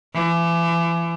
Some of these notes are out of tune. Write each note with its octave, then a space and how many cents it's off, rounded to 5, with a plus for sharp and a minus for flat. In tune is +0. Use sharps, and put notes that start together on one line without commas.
E3 +35